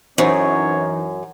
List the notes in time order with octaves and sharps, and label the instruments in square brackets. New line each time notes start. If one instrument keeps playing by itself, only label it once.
[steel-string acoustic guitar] F#2 [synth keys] E3 D#4 [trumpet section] C4 C#4 C#5 [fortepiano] C5